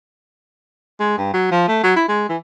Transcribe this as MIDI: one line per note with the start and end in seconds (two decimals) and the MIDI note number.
1.00 1.17 56
1.18 1.29 43
1.34 1.48 54
1.51 1.63 53
1.68 1.83 57
1.83 1.95 54
1.96 2.05 64
2.09 2.24 56
2.29 2.37 52